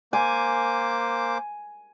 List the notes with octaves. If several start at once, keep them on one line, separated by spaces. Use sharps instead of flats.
A#3 C5 G#5 D6